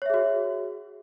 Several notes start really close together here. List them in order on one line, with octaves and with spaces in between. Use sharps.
C#5 E5 G#4 F#4